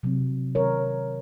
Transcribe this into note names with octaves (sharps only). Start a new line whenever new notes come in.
C3 F#3 C4
D#3 F#3 C4 A#4 C#5